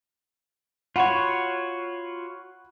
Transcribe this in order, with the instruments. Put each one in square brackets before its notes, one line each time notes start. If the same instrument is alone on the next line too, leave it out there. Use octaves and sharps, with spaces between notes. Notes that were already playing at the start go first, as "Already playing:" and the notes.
[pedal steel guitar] F4 F#4 C#5 [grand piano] F#5 B5